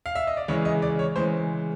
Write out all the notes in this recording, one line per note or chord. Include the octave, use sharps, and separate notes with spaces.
F5
E5
D#5
D5
C#3 E3 G#3 C#5
D#5
D5
C#5
C#3 E3 G#3 C5